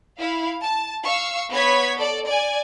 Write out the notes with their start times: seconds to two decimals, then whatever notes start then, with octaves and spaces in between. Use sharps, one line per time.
0.19 E4 F5
0.62 A5
1.05 F5 C#6 E6
1.51 B3 B4 C#5 G#6 B6
1.97 A4 D5
2.27 D5 G#5